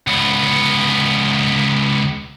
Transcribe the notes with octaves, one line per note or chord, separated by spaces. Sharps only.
C#2 B3